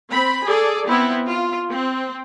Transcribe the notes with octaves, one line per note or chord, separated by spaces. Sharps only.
C4 B5
G#4 A4 D5
B3 C4 E4
F4
C4